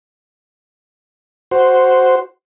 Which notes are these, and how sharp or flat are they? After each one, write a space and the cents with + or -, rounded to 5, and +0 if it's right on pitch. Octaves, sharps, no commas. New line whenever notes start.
F#4 +0 C5 -5